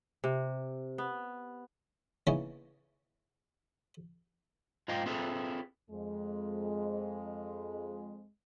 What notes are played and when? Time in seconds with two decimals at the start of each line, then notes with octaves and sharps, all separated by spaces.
0.24 C3
0.98 B3
2.27 C#3 E3 A#3 B3 C#4 D#4
4.88 G#2 F4 D#5 F5 G5
5.06 C4 E4 F4 G#4 A4 B4
5.90 F2 G#3